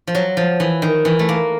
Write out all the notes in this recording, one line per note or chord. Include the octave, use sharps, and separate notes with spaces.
F3
F#3
F3
E3
D#3
E3
A3
A#3